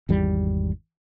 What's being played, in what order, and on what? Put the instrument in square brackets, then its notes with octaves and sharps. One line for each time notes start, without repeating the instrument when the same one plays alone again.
[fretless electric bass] G#1 E2 G3